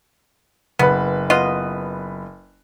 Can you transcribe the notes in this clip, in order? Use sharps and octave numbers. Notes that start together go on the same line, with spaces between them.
F#1 B3 B4
B3 F4 D#5